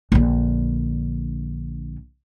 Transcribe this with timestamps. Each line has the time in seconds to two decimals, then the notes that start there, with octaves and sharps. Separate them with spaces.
0.12 A#1 D3